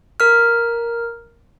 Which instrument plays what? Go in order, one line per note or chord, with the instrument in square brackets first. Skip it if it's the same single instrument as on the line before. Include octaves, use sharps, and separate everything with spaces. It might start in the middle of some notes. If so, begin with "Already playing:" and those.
[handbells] A#4 F6